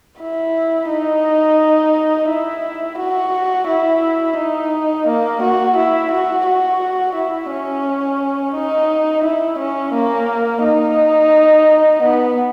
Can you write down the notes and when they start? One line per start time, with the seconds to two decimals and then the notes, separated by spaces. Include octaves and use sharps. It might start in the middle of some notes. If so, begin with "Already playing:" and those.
0.20 E4
0.89 D#4
2.29 E4
2.98 F#4
3.67 E4
4.37 D#4
5.07 A#3
5.42 F#4
5.76 E4
6.11 F#4
6.46 F#4
7.15 E4
7.50 C#4
8.55 D#4
9.24 E4
9.59 C#4
9.94 A#3
10.63 D#4
12.02 B3